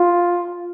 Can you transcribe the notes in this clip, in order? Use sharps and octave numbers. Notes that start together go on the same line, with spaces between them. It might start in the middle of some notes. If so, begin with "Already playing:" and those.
Already playing: F4